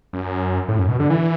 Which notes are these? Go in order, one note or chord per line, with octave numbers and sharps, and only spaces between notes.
F#2
A2
F#2
B2
D3
E3